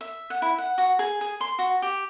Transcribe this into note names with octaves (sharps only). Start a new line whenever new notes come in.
E5
F#5
E4
F#5
F#4
G#4
G#4
C6
F#4
G4